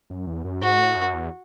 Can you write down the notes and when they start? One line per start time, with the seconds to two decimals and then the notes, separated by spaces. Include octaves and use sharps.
0.10 F#2
0.27 E2
0.44 F#2
0.62 G#2 F#4
0.79 A2
0.96 F#2
1.14 E2